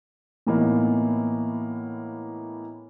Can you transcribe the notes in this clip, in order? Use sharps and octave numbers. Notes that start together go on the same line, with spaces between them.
A2 E3 A#3 B3 D#4